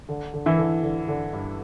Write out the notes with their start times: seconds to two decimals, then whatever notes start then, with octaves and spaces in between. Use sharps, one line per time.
0.09 D3
0.34 D3
0.46 E3 E4
0.58 D3
0.83 D3
1.08 D3
1.33 G2